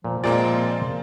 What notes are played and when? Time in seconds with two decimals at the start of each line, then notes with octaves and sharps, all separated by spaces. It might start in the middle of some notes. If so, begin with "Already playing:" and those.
0.04 A#2 F3
0.24 A#2 G#3 A#3 C4 F4 D5